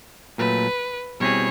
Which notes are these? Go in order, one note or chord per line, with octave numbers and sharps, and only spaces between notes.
A#2 F#3 A3 B4
B2 G3 C4 E4 G#4 C#5